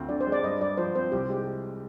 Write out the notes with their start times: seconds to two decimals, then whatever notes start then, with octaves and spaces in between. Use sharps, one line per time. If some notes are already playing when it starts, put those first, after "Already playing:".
Already playing: D2 C4 F4
0.09 D3 D5
0.21 C5
0.27 G#3
0.32 D5
0.43 G2 D#5
0.60 G2 D5
0.77 F3 C5
0.95 C4 C5
1.12 C2 G4
1.30 G#3 G4